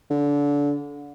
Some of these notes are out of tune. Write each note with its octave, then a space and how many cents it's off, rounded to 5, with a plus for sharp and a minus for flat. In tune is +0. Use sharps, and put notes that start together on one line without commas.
D3 -25